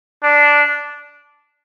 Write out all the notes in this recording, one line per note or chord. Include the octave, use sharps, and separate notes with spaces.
D4